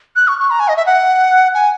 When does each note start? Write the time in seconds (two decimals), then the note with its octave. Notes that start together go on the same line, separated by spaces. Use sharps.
0.16 F#6
0.28 C#6
0.39 C#6
0.50 A#5
0.60 G#5
0.68 D#5
0.77 E5
0.86 F#5
1.54 G#5